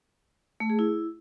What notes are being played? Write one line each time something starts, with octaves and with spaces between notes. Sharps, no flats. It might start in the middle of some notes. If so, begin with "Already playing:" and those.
A3
G#4
E4